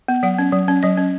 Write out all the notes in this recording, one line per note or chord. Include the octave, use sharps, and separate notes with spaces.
B3
F#3 F#5
C#4
F#3
C#4
F#3 D#5
C#4